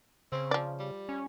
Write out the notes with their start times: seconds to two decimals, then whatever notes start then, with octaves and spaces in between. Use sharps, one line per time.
0.32 C#3 C4
0.51 F3 D5
0.79 G3
1.09 C#4